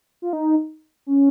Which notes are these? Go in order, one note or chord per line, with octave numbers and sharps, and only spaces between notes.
F4
D#4
C#4